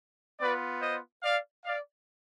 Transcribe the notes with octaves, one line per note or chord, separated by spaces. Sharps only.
B3 F4 B4 D5
C5 D#5
D5 F5
D5 F5